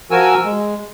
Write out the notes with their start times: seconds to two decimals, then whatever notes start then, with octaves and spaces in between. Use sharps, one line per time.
0.11 F3 F#4 A#4 G#5 E6
0.45 G#3